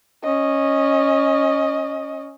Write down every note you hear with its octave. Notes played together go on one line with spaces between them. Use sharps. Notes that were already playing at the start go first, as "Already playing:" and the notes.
C#4 D#5